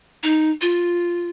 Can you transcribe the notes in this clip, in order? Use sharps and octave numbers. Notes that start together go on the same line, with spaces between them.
D#4
F4